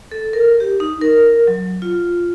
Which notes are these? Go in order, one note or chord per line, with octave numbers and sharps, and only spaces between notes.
A4
A#4
G4
D#4
A#4
F#3
F4